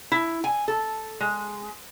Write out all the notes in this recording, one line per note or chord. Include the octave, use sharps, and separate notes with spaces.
E4
G#5
A4
G#3